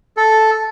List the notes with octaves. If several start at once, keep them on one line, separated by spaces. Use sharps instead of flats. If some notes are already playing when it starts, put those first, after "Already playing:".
A4